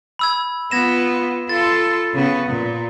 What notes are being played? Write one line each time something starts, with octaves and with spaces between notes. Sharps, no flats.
B5 E6 G#6
B3 F4 G#6 A#6 E7
F4 A4 A6
C#3 B3
A#2